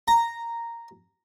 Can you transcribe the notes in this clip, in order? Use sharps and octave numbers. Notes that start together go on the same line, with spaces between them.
A#5